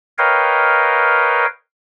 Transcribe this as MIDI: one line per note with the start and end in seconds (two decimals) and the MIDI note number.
0.18 1.46 70
0.18 1.46 71
0.18 1.46 73
0.18 1.46 75
0.18 1.46 77
0.18 1.46 79